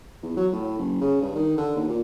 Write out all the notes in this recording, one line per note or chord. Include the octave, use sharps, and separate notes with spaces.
E2
F#3
A2
F#1
C#3
G2
D#3
D3
D#2
A#2